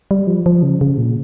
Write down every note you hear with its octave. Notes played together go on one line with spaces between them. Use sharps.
G3
F3
F3
C#3
C#3
A#2